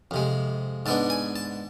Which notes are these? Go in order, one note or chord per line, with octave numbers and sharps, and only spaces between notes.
F2 C3 G#3
G#2 G#3 B3 D4 A5
G#5
A5